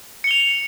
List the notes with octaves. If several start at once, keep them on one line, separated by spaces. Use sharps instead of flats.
C#7 F7 G7